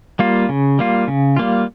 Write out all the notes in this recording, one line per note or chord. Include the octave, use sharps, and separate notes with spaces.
G3 A#3 F4
C#3
G3 A#3 F4
C#3
G3 A#3 F4